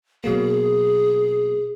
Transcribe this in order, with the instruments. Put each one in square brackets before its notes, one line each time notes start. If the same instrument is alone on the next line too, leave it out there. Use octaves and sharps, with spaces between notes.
[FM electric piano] B2 F#3 A#3 [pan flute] G#4